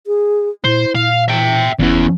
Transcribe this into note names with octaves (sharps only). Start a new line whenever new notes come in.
G#4
A#2 E4 C5
A#2 F5
E3 E5 G5
F#1 E2 E3 C#4